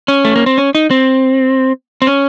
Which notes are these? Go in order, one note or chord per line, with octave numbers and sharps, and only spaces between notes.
C#4
A3
A#3
C4
C#4
D#4
C4
C4
C#4